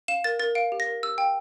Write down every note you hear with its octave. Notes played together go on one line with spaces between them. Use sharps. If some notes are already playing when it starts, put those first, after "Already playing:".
F5 E7
A#4 A6
A#4 A6
F5 D7
G4
A#6
A#4
G4 E6
F5 G5